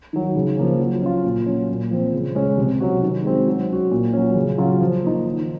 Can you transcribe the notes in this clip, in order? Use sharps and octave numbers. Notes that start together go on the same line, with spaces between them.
D#3 F#3
C#3
F3 A#3 C#4
F#3
C#4 F4
A#2
F#3 C#4
A#2
F3 C4
C#3
G#3 C#4
C3
F#3 C#4 F#4
D#3
G#3 C4 F#4
F#3
C#4 F#4
A#2
F#3 C#4
C#3
F#3 C#4 F4
F3
A#3 D#4
D#3